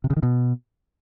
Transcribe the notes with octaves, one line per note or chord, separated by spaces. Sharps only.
C3
C#3
D#3
B2